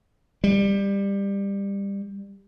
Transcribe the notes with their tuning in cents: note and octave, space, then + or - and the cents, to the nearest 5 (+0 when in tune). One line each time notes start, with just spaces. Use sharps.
G3 +20